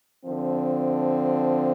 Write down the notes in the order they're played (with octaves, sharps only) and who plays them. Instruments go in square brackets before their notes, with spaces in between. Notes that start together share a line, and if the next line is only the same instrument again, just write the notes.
[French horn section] D3 F3 C4